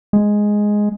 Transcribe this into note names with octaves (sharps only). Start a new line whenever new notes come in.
G#3